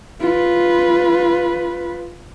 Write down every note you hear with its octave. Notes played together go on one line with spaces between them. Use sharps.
F4 B4